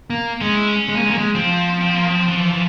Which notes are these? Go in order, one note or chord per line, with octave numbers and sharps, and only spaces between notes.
A#3
G#3 C#4
E4
C#4
G#3
A#3
G#3
A#3
G#3
F3 C4
C4
A#3
C4
E3
E3